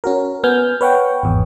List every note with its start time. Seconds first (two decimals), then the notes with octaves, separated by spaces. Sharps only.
0.04 C#4 F#4 A#4
0.44 B3 G#5 F6 G6
0.81 B4 C#5 F#5 G5
1.23 G#1 E2